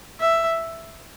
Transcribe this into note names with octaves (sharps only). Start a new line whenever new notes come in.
E5